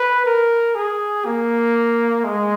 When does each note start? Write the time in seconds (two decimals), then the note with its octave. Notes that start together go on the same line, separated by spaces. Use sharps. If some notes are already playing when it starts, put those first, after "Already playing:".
Already playing: B4
0.26 A#4
0.75 G#4
1.25 A#3
2.24 G#3